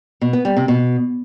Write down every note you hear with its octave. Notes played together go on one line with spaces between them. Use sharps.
B2
B3
G3
C3
B2